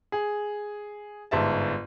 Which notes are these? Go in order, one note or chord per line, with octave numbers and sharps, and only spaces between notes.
G#4
G1 G#2 E5 A5